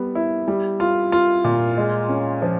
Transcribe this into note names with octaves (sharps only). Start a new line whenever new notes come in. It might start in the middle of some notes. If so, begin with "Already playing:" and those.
Already playing: G3 B3
E4
G3
F4
F4
A#2
G#3
C#4
F3